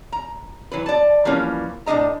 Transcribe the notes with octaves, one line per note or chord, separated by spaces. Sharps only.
A#5
E3 F#3 B4
D5 A5
E3 F3 G3 A#3 C#4
A2 G#3 D4 D#5 A#5